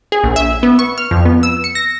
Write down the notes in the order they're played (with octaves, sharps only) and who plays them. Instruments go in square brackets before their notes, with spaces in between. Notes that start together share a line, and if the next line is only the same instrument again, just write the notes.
[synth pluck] G#4
A#1
E5
B3
C#6
F6
F2
B3
E6
C#7
A#6